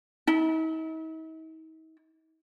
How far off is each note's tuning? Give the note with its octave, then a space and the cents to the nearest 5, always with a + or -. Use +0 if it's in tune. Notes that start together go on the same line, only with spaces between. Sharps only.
D#4 +45